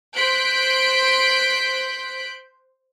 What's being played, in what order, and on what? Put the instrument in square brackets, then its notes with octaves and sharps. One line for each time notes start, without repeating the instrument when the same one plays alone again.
[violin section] C5 C6 F#6 G6 B6 D7